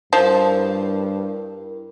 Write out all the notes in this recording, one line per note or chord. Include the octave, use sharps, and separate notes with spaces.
G2 F3 E4 A#4 C5